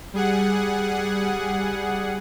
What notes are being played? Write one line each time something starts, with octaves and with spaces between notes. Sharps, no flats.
G3 G#4 F#5